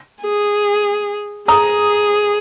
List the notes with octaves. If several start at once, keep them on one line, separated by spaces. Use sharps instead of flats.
G#4
G#4 A#5 D#6